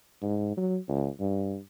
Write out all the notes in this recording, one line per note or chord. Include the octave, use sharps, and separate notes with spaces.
G#2
F#3
C#2
G2